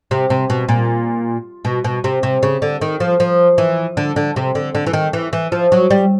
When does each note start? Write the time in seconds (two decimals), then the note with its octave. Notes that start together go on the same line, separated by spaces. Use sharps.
0.11 C3
0.30 C3
0.50 B2
0.69 A#2
1.65 B2
1.84 B2
2.04 C3
2.23 C3
2.43 C#3
2.62 D3
2.81 D#3
3.00 F3
3.20 F3
3.58 E3
3.97 D3
4.16 D3
4.36 C3
4.55 D3
4.75 D3
4.86 E3
4.93 D#3
5.13 E3
5.33 E3
5.52 F3
5.72 F#3
5.90 G3